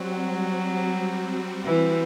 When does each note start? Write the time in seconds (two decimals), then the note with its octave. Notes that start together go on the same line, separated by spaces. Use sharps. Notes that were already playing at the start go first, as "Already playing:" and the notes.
Already playing: F#3 G3 C4 F#4
1.65 E3